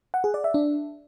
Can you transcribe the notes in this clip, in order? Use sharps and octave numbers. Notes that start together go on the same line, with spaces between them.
F#5
G#4
D5
E5
D4